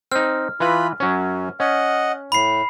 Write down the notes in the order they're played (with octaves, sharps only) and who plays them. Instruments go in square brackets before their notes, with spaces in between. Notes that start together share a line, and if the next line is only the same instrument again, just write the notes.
[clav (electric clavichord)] C4 D#4 [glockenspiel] F6
[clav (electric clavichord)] E3 B4 [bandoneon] F4 B5
[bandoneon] F#2 [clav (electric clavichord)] F#3 C#4
[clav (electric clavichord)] C#4 [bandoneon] D#5 F#5
[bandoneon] A2 [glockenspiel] B5 C7